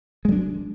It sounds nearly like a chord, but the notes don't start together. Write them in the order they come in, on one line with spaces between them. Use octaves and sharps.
G#3 F#3 D4